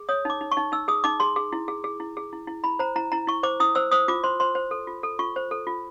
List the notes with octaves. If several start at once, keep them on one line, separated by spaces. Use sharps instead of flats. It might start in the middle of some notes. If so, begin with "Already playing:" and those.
Already playing: G#4
C#5 D#6
D#4 D6
D#4
C#6
D#4
D#4 E6
G#4 D#6
D#4 D6
G#4 C6
G#4
E4
G#4
G#4
E4
G#4
E4
E4
E4 B5
C5 A#5
E4 A#5
E4 A#5
E4 C#6
C5 D6
E4 D#6
C5 E6
C5 D#6
F4 D6
C5 C6
C5 C6
C5
A4
F4
A4
F4 C#6
C5
A4
F4